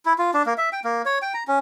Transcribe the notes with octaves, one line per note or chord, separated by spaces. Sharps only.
E4
F4
D4
A#3
E5
G5
A#3
C#5
G5
A#5
C#4